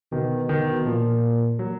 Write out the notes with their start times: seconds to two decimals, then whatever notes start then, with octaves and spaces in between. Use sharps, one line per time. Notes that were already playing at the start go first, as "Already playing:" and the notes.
0.12 B2 D#3
0.49 D#3
0.85 A#2 F3
1.59 F#3